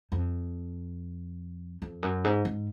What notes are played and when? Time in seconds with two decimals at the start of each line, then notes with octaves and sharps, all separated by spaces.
0.12 F2
1.82 F2
2.03 F#2
2.24 G#2
2.45 G#2